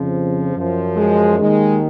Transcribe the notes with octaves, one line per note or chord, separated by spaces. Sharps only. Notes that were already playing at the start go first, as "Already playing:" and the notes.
Already playing: F2 C#3 F3
F#2 F3
G#3
D#2 D#3 G#3